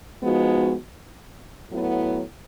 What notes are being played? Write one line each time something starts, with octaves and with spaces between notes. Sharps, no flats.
F3 G#3 B3 D#4 F#4
A2 F#3 B3 E4